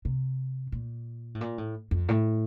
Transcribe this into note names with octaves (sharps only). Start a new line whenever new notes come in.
C3
A#2
A2
A#2
A2
F2
A2